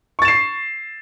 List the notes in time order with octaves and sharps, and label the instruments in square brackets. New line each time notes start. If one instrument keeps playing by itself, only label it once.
[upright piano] C#6
A6
E7
C7